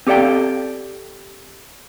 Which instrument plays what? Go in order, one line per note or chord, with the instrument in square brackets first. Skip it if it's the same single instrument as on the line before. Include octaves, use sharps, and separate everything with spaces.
[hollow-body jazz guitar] C4 G4 A4 D5 F5 G5